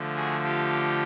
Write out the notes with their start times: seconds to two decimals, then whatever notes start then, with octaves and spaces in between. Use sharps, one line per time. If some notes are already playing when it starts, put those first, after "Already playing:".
Already playing: D3 F3 A3
0.16 F#4 G#4
0.44 F4 G4